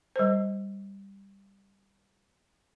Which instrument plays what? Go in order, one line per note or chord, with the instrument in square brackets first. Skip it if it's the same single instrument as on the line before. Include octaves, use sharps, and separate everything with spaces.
[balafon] G3 C5